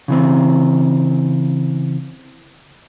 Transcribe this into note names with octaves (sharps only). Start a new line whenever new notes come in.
C#3 E3 C4